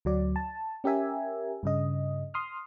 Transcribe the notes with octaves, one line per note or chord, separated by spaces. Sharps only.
D2 F#3 D5
A5
C#4 G4 A#4 E5 G#5
G2 C#3 D#5
C6 D#6 F6